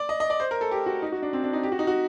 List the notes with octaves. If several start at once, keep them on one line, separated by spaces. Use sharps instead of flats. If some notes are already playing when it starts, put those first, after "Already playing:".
Already playing: D5
D#5
D#5
D5
C5
A#4
A4
G4
F#4
D#4
F#4
D4
C4
D4
D#4
G4
F#4
D#4
F#4